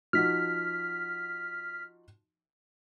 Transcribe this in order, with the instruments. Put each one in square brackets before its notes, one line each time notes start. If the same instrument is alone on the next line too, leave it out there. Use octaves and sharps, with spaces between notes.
[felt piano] F3 D#4 F#4 [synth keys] F6 B6